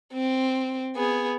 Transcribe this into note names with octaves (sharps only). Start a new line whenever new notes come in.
C4
B3 G#4